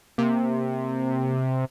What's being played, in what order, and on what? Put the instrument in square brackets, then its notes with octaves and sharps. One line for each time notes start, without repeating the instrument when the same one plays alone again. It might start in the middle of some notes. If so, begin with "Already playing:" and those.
[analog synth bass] C3 [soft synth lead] A#3